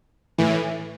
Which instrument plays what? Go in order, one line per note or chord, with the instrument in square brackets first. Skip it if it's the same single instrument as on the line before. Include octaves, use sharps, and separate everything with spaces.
[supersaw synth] A2 E3